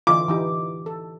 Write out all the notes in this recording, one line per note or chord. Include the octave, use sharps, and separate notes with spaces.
D3 E3 F4 D6
E3 D#4 G4
A4